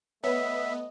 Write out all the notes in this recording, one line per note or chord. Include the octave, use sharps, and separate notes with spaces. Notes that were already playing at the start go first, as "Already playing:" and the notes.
A3 B3 B4 C#5 D#5 E5